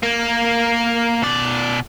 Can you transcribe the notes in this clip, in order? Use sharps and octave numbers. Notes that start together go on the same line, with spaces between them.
A#3
B2 D5